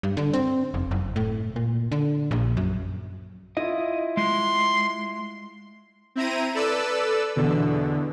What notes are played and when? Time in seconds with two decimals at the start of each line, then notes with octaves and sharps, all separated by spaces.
0.03 G2
0.17 D3
0.33 C4
0.74 F1
0.91 F#1
1.16 A2
1.56 A#2
1.92 D3
2.31 A#1
2.57 F#2
3.57 E4 F4 D#5
4.17 G#3 C6
6.15 C4 E4 A#5 D#7
6.55 A4 B4 D5 E6
7.36 E2 B2 D3